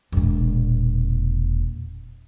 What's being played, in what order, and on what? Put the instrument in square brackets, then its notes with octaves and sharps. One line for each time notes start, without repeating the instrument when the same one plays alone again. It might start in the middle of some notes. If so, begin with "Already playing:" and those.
[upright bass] E1 A#2